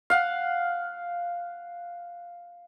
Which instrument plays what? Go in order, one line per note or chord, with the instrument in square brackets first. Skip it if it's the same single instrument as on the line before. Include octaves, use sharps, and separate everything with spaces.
[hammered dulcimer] F5 F#5